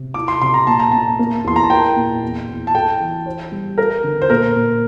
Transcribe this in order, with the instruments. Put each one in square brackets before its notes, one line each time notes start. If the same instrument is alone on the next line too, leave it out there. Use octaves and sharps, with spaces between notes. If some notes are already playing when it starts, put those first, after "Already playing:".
Already playing: [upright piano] C3
[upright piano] E4 [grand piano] D6
[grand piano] C6
[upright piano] C3 [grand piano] C6
[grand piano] A#5
[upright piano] A#2 [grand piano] A5
[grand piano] A#5
[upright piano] A#2 [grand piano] A5
[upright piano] A#3
[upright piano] E2 [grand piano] C6
[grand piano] A#5
A5
[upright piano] A#4 [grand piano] G5
[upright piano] A#2
E2
E2
[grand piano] A5
[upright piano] A4 [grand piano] G5
[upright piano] E3
C5
G3
[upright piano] A4 [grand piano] A#4
[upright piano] D3
[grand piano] C5
[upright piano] A#2 [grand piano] A#4
[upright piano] A#2